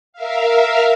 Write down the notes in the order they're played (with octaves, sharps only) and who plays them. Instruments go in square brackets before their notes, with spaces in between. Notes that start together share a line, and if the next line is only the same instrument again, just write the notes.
[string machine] A#4 E5 F5